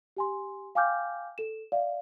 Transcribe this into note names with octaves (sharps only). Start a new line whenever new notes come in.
G4 G#5 C6
F5 G5 G#5 D6 F6 G6
A4 E7
D5 E5 F5